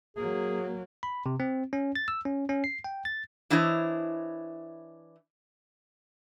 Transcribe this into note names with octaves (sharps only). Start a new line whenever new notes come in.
F#3 A#3 G#4
B5
C3
C4
C#4
A6
E6
C#4
C#4
C7
G5
A6
E3 D4 E4 C5 C#5 D#5